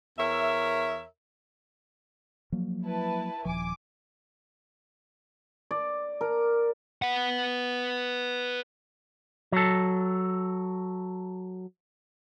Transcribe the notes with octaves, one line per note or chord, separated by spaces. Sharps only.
E2 A#4 C#5 E5
F3 F#3 A#3
E4 B4 A5
D#1 F3 G#5 D6
D5
A#4
B4 F#5
F#3 A4